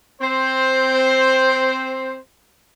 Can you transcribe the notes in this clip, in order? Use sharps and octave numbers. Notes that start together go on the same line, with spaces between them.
C4 C5